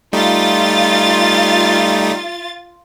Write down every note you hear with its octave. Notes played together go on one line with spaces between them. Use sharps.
G3 A3 D#4 F4 A6